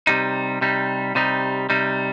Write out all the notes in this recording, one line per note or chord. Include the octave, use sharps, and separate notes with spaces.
C3 G3 D#4
C3 G3 D#4
C3 G3 D#4
C3 G3 D#4